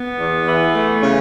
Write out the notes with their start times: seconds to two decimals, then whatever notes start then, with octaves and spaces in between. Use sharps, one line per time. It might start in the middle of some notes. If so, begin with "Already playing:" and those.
Already playing: B3
0.19 E2
0.46 E3
0.74 A3
1.02 C#3 C#4